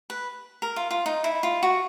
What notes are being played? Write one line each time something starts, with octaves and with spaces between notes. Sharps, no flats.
B4
A#4
F4
F4
D#4
E4
F4
F#4